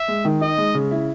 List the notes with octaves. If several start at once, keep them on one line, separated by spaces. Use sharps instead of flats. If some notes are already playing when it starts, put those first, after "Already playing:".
Already playing: E5
G#3
D#3
D#4 D#5
G#3
C#3
E4